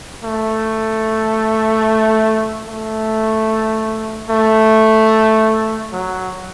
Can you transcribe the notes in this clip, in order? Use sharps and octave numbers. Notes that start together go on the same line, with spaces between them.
A3
A3
A3
F#3